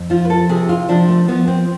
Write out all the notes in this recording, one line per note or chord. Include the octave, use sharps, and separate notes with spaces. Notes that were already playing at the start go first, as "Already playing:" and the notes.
Already playing: F2
F3 F4
B4
A4
C3 G#4
F4
F3 D4
A3
F3 B3
C4